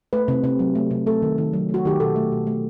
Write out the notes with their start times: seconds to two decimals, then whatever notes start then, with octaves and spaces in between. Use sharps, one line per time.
0.13 A3 B4
0.28 C3
0.44 C3
0.59 F#3
0.75 A3
0.91 C3
1.06 A3 A4
1.22 D#3
1.38 D#3
1.53 F#3
1.69 A3
1.74 F#4
1.85 D#3 G4
2.00 B2 A4
2.16 A3
2.32 B2
2.47 A3